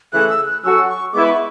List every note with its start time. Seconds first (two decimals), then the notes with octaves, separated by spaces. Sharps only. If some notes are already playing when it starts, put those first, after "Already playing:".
0.13 C#3 E3 A3 E4 G#4 F#6
0.30 E6
0.46 F#6
0.63 F#3 C#4 F#4 A4 E6
0.88 C#6
1.13 G#3 B3 E4 B4 D6
1.24 B5
1.31 C#6